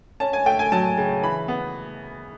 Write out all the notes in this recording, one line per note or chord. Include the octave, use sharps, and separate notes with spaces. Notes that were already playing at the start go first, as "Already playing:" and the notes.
C#4 A5
G#5
A3 G5
G#5
F#3 A5
C#3
E3 B5
B3